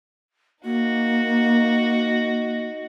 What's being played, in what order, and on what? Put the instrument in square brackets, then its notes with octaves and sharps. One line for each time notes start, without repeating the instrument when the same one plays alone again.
[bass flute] A#3 [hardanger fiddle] D#4 F#4